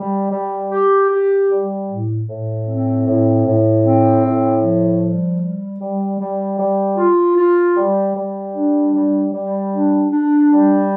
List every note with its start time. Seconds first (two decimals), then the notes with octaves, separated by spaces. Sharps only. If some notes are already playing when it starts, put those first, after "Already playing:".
Already playing: G3
0.31 G3
0.71 G4
1.10 G4
1.49 G3
1.88 A2
2.27 A2
2.66 C4
3.06 A2
3.45 A2
3.83 C4
4.23 A2
4.62 F3
5.02 G3
5.41 G3
5.80 G3
6.19 G3
6.58 G3
6.97 F4
7.36 F4
7.75 G3
8.15 G3
8.54 D4
8.93 G3
9.32 G3
9.72 D4
10.10 D4
10.50 G3